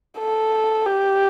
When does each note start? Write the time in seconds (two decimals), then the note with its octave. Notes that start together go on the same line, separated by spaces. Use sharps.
0.18 A4
0.86 G4